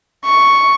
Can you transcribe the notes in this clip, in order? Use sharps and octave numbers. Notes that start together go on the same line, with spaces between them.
C#6